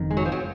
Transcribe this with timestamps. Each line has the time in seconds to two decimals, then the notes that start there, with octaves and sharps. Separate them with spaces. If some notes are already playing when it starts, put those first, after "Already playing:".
Already playing: F#1 F2 D#3
0.11 G#3
0.17 F#3
0.25 F3
0.32 F#3